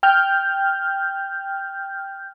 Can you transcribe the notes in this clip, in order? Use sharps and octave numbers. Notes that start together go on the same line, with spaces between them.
G5 F6 G6